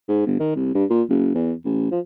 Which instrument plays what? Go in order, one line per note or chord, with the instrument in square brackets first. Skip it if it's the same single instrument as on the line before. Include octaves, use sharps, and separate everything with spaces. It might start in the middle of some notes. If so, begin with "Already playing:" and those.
[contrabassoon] G#2
G1
D#3
C2
G2
A#2
F#1
E2
A1
F3